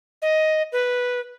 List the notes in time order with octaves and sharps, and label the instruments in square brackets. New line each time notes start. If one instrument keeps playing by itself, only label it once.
[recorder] D#5
B4